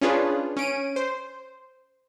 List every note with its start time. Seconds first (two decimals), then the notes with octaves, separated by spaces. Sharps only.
0.01 C#4 D4 F4 G#4 B4
0.56 C#4 D7 D#7
0.96 C5